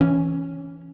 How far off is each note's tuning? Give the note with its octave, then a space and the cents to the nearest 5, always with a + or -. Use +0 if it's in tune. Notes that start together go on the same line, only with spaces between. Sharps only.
E3 +0 C#4 +0